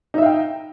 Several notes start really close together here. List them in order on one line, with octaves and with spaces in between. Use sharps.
D#4 E5 F5 G5